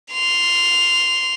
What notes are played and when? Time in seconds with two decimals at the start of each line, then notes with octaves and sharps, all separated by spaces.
0.11 C6 F7